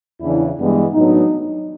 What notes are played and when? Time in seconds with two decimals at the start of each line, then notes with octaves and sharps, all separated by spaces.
0.21 E2 C#3 E3 D4 E4
0.57 G2 E3 G#3 B3
0.93 A2 F#3 B3 D4 D#4